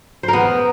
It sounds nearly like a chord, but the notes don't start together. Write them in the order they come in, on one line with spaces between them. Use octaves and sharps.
C5 A#4 B3